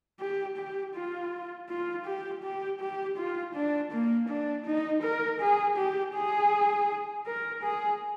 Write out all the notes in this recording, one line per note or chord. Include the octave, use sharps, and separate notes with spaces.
G4
G4
F4
F4
G4
G4
G4
F4
D4
A#3
D4
D#4
A#4
G#4
G4
G#4
A#4
G#4